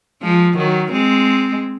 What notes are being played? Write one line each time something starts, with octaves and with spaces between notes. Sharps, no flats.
F3 G#3
D#3 F#3
G#3 C4